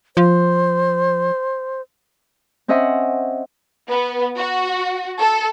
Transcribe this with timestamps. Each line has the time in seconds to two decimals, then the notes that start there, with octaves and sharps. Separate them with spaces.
0.17 F3 C5
2.68 C4 C#4 D#5 E5 F#5 C6
3.88 B3
4.37 F#4
5.19 A4